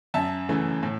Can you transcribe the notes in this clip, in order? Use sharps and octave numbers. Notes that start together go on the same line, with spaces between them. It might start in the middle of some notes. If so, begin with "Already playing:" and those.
F#2 E5 A5
C#3 E3 A3
A2